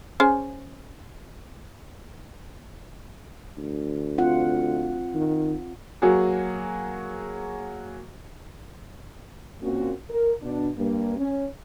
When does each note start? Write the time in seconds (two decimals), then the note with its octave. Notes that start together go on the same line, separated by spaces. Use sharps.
0.20 C#4 G#4 C5
3.58 D2
4.18 C4 F4 F#5
5.14 D#3
6.02 F#3 A#3 F#4 G#4
9.62 A#2 A#3 C4 C#4 F#4
10.10 A#4
10.42 B2 D4
10.77 G2 A#3
11.17 C#4